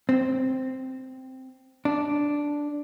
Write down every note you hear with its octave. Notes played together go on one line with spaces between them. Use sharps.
C4
D4